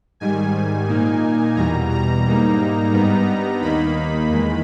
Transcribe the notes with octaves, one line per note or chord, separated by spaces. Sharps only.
G#2 D#3 G3 G#5
A#2 A#3 D#4
E2 B2 G3 A#5
A#5
G#2 G3 A#3 D#4
G2 G3 B3 D#4
D#2 D#3 A#3 D#4 B5
E2 D#3 G#3